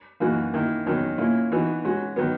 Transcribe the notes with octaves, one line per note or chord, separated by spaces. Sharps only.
F#2 E3 A#3 D#4 F#4
D#3 A#3 E4
E2 D#3 F#3 C#4
A#2 A#3 C#4 E4
E3 B3 D#4 F#4
C#3 G#3 C#4 F#4
D#3 F#3 B3